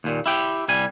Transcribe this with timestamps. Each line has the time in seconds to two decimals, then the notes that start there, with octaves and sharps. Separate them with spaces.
0.04 D#2 A#2
0.26 E4 G4 G5
0.68 C2 G3 G#5